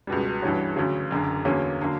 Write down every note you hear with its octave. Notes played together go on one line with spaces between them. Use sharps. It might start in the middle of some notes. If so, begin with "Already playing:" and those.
C#2 B2 G3
G2 E3 G3 C#4 F#4
D2 C#3 F#3
F#1 F#2 D3
E2 D3 F#3 A#3 C#4
D3 F#3 A#3